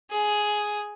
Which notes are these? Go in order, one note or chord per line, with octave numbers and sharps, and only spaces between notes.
G#4